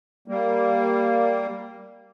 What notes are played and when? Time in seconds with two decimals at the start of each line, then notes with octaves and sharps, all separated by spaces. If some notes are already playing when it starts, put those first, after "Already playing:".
0.28 G3 A#3